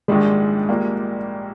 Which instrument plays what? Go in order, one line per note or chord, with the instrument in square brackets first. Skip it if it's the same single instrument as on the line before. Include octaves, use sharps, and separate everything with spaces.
[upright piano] A#1 G#2 D#3 G3 D4 [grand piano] G#3
[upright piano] A#1 A#2 G3 A#3